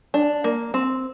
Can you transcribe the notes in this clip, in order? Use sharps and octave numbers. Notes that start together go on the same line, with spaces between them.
D4
A#3
C4